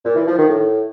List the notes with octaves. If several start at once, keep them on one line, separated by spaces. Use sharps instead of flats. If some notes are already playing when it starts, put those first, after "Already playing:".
A#2
E3
F3
D#3
A2